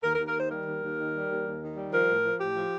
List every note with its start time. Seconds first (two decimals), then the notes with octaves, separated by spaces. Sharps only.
0.03 D#2 A#4
0.15 A#4
0.19 D#2
0.27 A#4
0.35 D#3 C5
0.50 G3 A#4
0.66 D#2
0.82 D#2
0.98 D#3
1.14 G3
1.28 D#2
1.45 D#2
1.61 D#3
1.77 G3
1.92 F3 A#4
2.07 A2
2.24 F3
2.40 A2 G4
2.55 F3